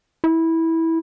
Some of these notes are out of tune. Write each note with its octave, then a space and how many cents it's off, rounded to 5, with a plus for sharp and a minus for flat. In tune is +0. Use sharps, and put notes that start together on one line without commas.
E4 -15